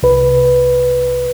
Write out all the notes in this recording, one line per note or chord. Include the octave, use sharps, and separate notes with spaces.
C2 B4